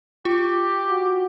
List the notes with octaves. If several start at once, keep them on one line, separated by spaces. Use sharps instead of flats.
F4 G4
F#4